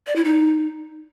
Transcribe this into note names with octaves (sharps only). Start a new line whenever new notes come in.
D5
E4
D#4